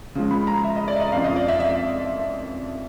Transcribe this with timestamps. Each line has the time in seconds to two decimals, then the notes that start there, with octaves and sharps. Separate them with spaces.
0.15 C#3 F3 G#3
0.31 B5
0.47 A#5
0.64 E5
0.76 D#5
0.88 D5
0.95 E5
1.00 D#5
1.12 F2 C#3 F3 F5
1.24 D#5
1.36 D5
1.48 E5
1.60 E5